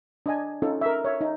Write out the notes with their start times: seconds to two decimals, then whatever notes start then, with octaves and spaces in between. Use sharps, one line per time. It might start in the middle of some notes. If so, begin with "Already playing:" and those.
0.26 D4 D#5 G#5
0.62 C#4 D#4 F4 A4
0.81 A#4 E5
1.05 C#5 E5
1.21 D#4